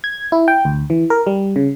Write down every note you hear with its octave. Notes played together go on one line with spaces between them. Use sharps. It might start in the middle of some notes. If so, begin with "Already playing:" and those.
G#6
E4
G5
D2
E3
A#4
G3
C#3